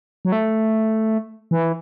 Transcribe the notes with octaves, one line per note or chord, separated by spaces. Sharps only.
F#3
A3
E3